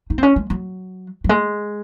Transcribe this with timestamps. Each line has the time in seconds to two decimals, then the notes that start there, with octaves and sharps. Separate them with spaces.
0.10 D#4
0.18 C4
0.23 C#4
0.36 G#3
0.50 F#3
1.24 F#3
1.29 G#3